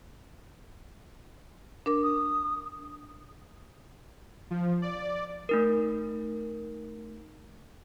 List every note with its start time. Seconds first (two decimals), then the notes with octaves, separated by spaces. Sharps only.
1.86 D4 A#4 D6
2.03 D#6
4.51 F3
4.82 D5
5.49 A3 D#4 A#4